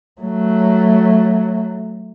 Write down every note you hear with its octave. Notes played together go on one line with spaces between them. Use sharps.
F#3 A3